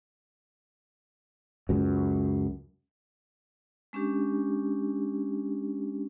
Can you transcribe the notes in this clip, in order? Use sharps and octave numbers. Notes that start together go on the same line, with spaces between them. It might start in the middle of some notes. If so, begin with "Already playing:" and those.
C#2 F#2
G#3 C#4 D4 G4